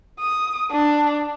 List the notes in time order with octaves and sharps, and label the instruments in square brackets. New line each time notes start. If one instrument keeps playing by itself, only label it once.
[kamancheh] D#6
D4